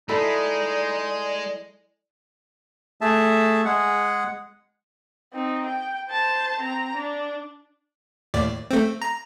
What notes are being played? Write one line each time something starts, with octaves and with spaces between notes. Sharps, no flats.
G#3 D#4 E4 A4 D5 B5
A3 G#4 E5 A5
G#3 G#4 F#5
C4 D#4
G5
C5 A5
C4 A#5
D4
D#2 A2 D5
A3 C4
A#5